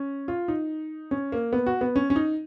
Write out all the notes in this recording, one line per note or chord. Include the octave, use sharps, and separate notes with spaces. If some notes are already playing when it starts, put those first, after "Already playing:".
Already playing: C#4
F4
D#4
C#4
A#3
B3
F#4
B3
C#4
C#4
D#4